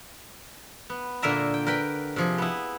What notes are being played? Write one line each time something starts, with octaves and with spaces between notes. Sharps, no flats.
B3
A#2 D3 A#3 A#4 E5 A#5
G5
A#4 B4 G5 B5
C3 F3 G#4
B3 E4